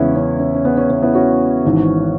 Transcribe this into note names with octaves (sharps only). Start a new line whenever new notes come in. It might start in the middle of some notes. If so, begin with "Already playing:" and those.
Already playing: E2 C#3 G#3 B3 C#4 E4
C#4
C#4
C#4
B3
C#4
B3
B3 E4
C#4 F#4
G#1 G#2 E3